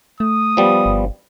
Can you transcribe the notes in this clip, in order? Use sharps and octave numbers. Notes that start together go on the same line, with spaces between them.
A3 D#6
F3 G3 B3
G1